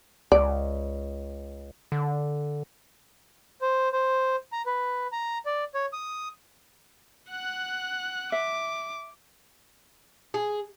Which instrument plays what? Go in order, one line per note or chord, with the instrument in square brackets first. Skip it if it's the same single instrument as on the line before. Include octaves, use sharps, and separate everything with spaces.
[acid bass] C#2 [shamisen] D5
[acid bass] D3
[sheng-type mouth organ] C5
C5
A#5
B4
A#5
D5
C#5
D#6
[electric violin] F#5 F#6
[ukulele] E5 [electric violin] D6
[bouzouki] G#4